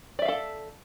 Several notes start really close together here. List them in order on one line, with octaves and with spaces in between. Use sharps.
D5 E5 F5 A4